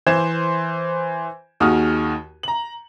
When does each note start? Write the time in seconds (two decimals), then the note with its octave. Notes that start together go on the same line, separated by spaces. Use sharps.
0.07 E3 C5 C6 G#6 E7
1.60 D#2 D#3 F#4 G#4 D#6 F6
2.43 A#5 F#7